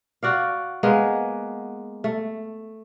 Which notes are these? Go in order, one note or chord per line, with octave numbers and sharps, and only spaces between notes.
F#4 D5 F5
G#3 A#3 B3
A3